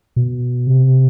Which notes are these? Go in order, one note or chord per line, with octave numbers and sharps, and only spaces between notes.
B2
C3